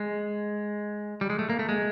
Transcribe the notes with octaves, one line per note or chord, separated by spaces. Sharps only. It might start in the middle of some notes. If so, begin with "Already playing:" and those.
Already playing: G#3
G3
G#3
A3
A#3
A3
G#3